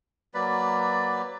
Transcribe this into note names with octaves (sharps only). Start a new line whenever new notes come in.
F#3 A#3 B4 D5